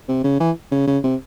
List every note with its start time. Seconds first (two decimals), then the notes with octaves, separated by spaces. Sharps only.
0.09 C3
0.24 C#3
0.40 E3
0.72 C#3
0.87 C#3
1.04 C3